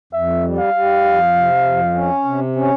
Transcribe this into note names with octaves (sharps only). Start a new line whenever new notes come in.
F2 E5
G3
F5
G3
F2
C3
F2
C#4
C3
C#4